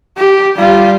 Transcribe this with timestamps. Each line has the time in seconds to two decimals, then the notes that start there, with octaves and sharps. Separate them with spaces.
0.17 G4
0.56 G3 F4